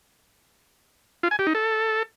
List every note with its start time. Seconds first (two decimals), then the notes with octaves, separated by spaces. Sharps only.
1.23 F4
1.31 G#5
1.39 G4
1.47 D#4
1.55 A4